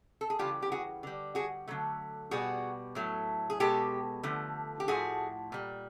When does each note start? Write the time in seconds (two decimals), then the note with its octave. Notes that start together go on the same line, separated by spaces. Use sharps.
0.21 A4
0.30 G#4
0.39 C#3 E3 G3 F4 G4
0.62 G4
0.72 F#4 G#4
1.03 D3 G3
1.35 F#4 G#4
1.68 D3 F#3 A3
2.31 B2 G3 F#4 G#4
2.95 A2 F#3 A3
3.50 G#4
3.60 B2 G#3 G4 A4
4.23 D3 F3 A3
4.80 G4
4.88 A2 F3 A3 F#4 G#4
5.52 A#2 G3